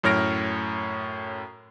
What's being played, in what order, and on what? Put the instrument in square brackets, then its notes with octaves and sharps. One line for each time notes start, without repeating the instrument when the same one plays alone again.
[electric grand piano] F#2 A2 C#5 F6 A#6 D7